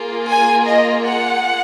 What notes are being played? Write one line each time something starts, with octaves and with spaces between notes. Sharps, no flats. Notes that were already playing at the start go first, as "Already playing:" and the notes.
Already playing: A#3 F4 G#4
G#5
D#5
F#5